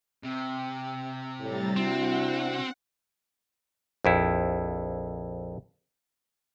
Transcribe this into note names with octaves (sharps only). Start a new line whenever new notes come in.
C3
A2 G3 A#5 A6
C4 D4 E4 F#4 F#5
A#1 F2 E4